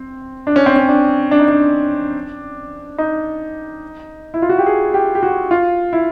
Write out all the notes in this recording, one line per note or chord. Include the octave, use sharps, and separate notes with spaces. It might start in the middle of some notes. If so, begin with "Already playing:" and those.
Already playing: C4
D4
C#4
C4
C#4
D4
D4
D#4
D4
D#4
E4
F4
F#4
G4
G#4
G4
G4
F#4
F4
E4